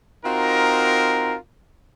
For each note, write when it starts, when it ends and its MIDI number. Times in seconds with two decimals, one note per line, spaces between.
0.25 1.36 60
0.25 1.36 63
0.25 1.36 65
0.25 1.36 66
0.25 1.36 70